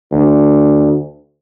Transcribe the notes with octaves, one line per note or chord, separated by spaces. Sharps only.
D2